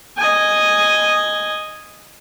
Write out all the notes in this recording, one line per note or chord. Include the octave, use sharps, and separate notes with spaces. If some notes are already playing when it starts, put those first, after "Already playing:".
D#5 G#5